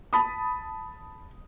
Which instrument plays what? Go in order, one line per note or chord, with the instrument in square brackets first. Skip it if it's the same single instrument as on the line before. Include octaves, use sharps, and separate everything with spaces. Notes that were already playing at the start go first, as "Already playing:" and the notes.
[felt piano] A5 B5 D#6